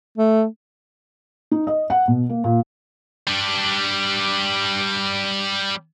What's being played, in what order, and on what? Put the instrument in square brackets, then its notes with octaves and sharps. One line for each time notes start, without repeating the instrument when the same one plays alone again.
[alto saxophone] A3
[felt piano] D#4
D#5
F#5
B2
A#3
A#2
[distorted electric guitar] G3 D4